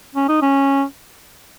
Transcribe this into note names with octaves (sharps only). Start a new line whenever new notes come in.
C#4
D#4
C#4